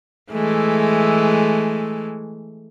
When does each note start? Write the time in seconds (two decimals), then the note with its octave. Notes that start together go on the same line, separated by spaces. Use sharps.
0.32 E3 G#3 A3